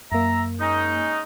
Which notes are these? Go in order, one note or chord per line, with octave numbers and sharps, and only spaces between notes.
F#2 A#3 E5 A#5
G#3 C#4 D#4